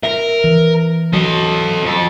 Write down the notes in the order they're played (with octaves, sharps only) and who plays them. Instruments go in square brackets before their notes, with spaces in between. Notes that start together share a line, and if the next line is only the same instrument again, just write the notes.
[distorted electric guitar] A#4 [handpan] E5
[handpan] E3
[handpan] F#3 [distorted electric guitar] A4 D#5
[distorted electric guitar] F2 A4